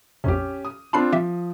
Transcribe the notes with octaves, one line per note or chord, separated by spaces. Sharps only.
A#1 F2 C3 C#4 G4
D#6
C4 D4 F4 A5 B5 C7
F3 G4 E5